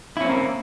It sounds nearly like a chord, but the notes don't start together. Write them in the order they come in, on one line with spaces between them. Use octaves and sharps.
E4 C#4 C4 A#3